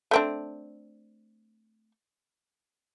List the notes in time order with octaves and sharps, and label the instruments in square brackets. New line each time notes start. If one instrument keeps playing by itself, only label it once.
[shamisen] A3 C4 D4